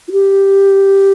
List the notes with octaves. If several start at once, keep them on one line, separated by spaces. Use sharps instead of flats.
F4
G4